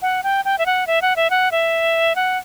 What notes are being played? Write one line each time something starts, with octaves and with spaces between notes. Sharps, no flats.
F#5
G5
G5
E5
F#5
E5
F#5
E5
F#5
E5
F#5